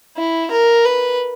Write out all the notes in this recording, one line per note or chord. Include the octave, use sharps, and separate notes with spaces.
E4
A#4
B4